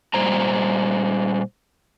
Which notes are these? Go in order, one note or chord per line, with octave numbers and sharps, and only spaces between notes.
A#2 G3 C5 A#5